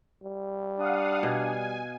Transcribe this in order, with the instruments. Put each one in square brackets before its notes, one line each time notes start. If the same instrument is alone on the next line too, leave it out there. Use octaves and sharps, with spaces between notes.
[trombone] G3
[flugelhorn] D4 [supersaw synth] F5 F#5 D#6
[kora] B2 [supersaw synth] G#5